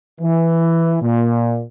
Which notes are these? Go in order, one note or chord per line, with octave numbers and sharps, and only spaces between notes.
E3
A#2